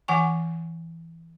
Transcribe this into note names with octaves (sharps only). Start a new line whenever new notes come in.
E3 F#5 G#5 C#6